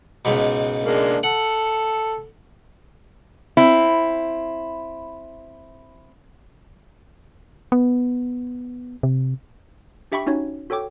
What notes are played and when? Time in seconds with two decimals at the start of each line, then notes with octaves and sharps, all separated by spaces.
0.25 C#2 G#2 B2
0.84 G#3 A#3 D4
1.23 A4 F#5
3.57 C4 E4
7.72 B3
9.03 C3
10.12 D4 G4 E5 G5 B5 C#6
10.26 C#4 D#4 F#4 C#5
10.70 F#4 A4 C#5 G5 D6